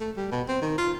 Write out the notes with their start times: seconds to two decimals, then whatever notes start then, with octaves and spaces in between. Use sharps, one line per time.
0.01 A3
0.17 G3
0.32 B2
0.48 C4
0.62 D#3
0.78 F4